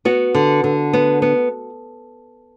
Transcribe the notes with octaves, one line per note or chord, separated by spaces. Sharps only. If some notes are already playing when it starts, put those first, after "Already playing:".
B3 F#4
D3
D3
B3
B3